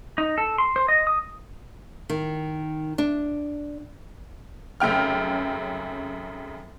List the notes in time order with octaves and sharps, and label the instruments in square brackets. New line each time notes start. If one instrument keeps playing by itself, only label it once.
[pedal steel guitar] D#4
A4
C6
C5
D#5
D#6
[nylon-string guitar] D#3
D4
[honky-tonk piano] F1 F#2 C#3 G5 F6